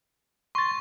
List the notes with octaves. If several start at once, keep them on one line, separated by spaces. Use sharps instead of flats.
C6 C#6 A6